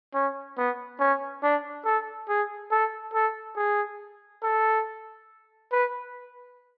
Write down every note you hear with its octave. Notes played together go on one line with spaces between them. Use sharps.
C#4
B3
C#4
D4
A4
G#4
A4
A4
G#4
A4
B4